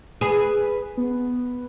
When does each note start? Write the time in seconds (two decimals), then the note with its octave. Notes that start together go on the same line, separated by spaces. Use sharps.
0.21 G#4 B4
0.97 B3